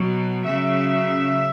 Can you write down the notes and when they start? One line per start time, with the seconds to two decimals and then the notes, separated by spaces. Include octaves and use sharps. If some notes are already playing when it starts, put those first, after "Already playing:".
Already playing: B2 F#3
0.45 C#3 F#3 E5